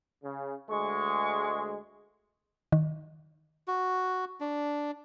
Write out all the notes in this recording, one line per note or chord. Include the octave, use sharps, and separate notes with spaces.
C#3
D2 G#3 C#6
D#3
F#4
D4